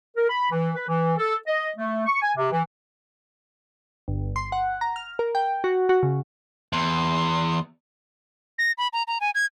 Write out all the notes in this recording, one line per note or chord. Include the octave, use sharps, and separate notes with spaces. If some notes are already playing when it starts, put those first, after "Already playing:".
A#4
B5
E3
B4
E3
A4
D#5
A3
C#6
G#5
C3
E3
G1
C6
F#5
A#5
F6
A#4
G5
F#4
F#4
C#3
E2 C6
A#6
B5
A#5
A#5
G#5
G#6